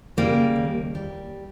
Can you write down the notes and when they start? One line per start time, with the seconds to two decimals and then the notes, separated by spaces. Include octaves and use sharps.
0.17 C#3 G3 A#3
0.56 D#2
0.95 G3